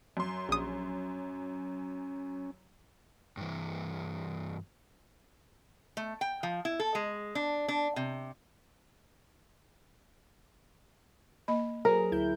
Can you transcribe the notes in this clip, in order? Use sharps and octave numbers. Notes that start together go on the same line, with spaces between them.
F#2 C6
A#1 C#4 D#6
G2 E3
A3
G5
F3
E4
A4
G#3
D4
D4
C3
A#3 D#5 B5
F#3 G#4 A#4 C5
D2 E4 G6